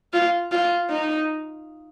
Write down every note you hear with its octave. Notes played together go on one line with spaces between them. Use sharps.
F4
F4
D#4